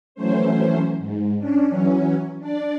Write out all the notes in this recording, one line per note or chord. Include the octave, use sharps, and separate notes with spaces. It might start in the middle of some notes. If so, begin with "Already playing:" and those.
E3 F#3 A3 C#4 C5
G#2
C#4 D4
E3 F#3 C#4
D4 D5